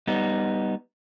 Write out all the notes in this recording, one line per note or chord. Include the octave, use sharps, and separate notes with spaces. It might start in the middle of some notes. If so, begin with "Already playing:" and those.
G3 B3 D#4